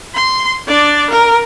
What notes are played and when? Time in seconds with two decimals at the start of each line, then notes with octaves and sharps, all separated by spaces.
0.15 C6
0.68 D4 D5
1.10 A#4